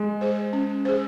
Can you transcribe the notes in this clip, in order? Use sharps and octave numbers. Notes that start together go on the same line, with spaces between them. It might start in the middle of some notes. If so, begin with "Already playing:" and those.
Already playing: G#3
G#4 C5
C#4
G#4 C5